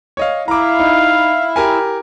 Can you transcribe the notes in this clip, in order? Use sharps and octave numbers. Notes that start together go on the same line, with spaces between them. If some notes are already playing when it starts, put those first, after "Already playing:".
C#5 D#5 F5
E4 F5 A#5 D6
D#4
G4 A#4 G#5